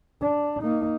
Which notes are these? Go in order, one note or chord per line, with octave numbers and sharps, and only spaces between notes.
D4
A#3 D#4